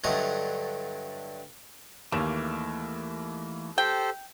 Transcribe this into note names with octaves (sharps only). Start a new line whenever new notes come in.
G2 D3 F#3 A3 D#5 A#5
D#2 C#3 E3 A3 A#3
G4 A4 C5 G5